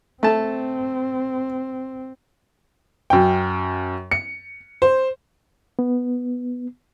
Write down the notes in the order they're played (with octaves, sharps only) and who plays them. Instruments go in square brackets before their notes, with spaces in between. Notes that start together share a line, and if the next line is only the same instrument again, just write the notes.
[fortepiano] A3 A5 [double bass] C4
[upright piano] F#2 G5
C#7
C5
[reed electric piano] B3